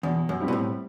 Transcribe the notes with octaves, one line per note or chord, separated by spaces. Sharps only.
E2 B2
F#2
G3 C4 E4 G4
B2
A2